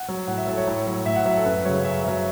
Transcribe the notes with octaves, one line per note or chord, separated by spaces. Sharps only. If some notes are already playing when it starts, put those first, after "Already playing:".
Already playing: F#5
F#3
A2 F#5
E5
F#3 A4
C#5
A2
F#3
A2 E5
F#5
F#3 E5
A4
F#2 B4
C#3 F#3 C#5
F#2 E5
C#3 F#3 E5